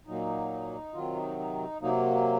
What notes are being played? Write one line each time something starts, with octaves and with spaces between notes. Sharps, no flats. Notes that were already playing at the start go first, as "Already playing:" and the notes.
A#2 F#3 A#3 D#4
C3 D#3 F#3 F4
D#4
D#4
C3 F#3 A#3 D#4